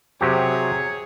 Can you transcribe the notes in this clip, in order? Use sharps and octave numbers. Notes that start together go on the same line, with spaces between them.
C3 F#3 G4 G#4 C#5